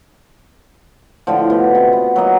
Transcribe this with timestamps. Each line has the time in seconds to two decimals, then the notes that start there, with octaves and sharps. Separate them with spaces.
1.27 A2 D3 F3
1.50 B2
1.75 C3
1.93 B3
2.16 F#3 A#3 D#5